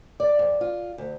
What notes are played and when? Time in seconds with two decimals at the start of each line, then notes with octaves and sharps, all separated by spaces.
0.20 D5
0.39 F2
0.61 F4
0.98 D2